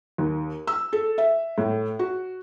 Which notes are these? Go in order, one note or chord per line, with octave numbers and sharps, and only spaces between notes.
D#2
E6
A4
E5
A2
F#4